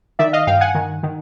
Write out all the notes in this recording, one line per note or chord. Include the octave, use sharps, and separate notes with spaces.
D#3 D5 E5
D#5 F5
G2 F5 G5
F#5 G#5
D#3
D#3